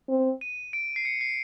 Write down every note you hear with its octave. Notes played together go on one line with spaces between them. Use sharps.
C4
D#7
D7
C7
C#7
C7